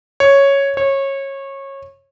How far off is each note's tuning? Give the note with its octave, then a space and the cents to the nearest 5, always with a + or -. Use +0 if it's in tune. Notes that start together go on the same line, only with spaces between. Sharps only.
C#5 +0
C#5 -20